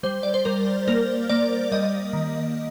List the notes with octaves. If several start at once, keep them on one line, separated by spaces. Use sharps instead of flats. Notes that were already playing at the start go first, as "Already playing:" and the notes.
G3 C5
D5
C5
G3 A#4
A#3 A#4
A#3 D5
G3 D#5
D#3